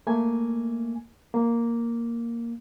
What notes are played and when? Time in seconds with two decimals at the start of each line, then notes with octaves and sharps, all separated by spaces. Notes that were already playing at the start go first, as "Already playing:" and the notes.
0.07 A3 A#3 G#5
1.34 A#3